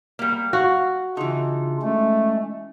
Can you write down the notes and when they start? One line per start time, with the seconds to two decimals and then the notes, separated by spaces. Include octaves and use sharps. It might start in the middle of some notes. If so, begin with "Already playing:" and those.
0.19 G3 A#3
0.53 F#4 F5
1.17 C#3 E3 D4 D#4 F4
1.82 G#3 A3 C#4